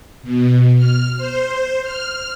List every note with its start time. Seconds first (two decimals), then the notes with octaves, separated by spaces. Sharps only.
0.23 B2
0.77 F6
1.17 C5
1.83 F6